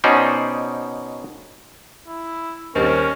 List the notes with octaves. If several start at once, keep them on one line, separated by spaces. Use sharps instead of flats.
B2 C#4 D#4 C5 D5
E4
D#2 G3 C4 C#4 A#4